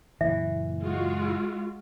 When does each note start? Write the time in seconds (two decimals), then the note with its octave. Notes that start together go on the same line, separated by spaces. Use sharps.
0.21 F#1 A#2 E3 E5
0.80 G#3 F4 F#4